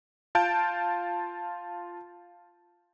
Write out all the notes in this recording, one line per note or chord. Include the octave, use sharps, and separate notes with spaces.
F4 F5 A5 G6 D7